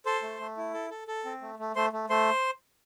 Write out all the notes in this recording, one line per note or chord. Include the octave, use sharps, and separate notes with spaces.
A4 C5 C6
A3
A3
E4
A4
A4
A4
C4
A3
A3
A3 C5 C6
A3
A3 C5 C6